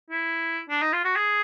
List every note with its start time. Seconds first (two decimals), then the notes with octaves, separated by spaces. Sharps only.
0.11 E4
0.70 D4
0.82 D#4
0.93 F4
1.05 F#4
1.16 G#4